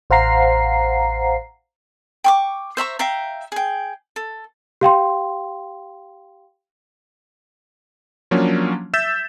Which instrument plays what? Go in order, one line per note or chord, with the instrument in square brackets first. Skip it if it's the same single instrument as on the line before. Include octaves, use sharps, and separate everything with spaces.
[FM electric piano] A1 C5 F5 F#5 A#5 C7
[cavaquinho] G5 C#6 D6
C5 E5 A#5 C#6
E5 F5 G5 A#5
G#4 G5
A4
[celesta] G4 F5 G5 C6
[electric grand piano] F3 F#3 A#3 C#4 D4
E5 E6 G6 A6 B6 E7